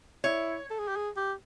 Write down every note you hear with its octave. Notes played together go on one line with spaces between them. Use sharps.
E4 C#5
A4
G#4
G4
G#4
G4